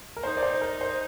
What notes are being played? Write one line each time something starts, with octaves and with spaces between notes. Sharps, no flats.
A#4
D#4 C5
D5
C5
A#4
C5